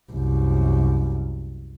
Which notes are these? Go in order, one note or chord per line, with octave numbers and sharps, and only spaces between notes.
C2 F#2